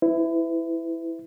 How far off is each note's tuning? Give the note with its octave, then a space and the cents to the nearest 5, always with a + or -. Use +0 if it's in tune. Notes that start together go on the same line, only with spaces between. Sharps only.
E4 +0 B4 +35